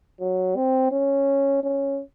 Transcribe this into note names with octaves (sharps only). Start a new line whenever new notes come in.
F#3
C4
C#4
C#4